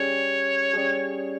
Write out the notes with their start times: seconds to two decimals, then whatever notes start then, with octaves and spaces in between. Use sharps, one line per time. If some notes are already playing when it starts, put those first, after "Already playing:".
Already playing: G3 C#4 G#4 C#5
0.73 G3 C#4 G#4